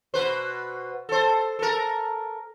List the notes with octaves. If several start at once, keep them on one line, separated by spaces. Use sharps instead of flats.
B2 B4 C5
A4 C5
A4 A#4